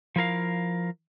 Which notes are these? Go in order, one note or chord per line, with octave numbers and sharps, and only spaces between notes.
F3 E4 A#4 F5